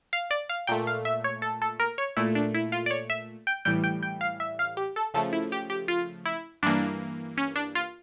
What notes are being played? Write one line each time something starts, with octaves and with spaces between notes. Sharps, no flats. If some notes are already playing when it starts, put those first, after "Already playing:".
F5
D5
F5
A#2 A3 G5
F5
E5
C#5
A4
A4
A#4
C#5
A#2 A3 E4
D4
E4
F4
D5
C#5
E5
G5
A2 E3 G3 G5
G5
G5
F5
E5
F5
G4
A4
C#3 F3 A3 A4
E4
G4
G4
F4
E4
G2 E3 A#3 D4
C#4
D4
F4